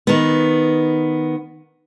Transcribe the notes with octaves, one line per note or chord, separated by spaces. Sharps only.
D#3 B3